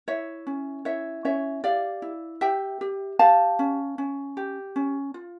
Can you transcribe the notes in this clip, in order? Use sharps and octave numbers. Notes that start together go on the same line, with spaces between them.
E4 C#5 E5
C#4
E4 C#5 E5
C#4 C#5 E5
G4 D5 F5
E4
G4 E5 G5
G4
G4 F5 A5
C#4
C#4
G4
C#4
F4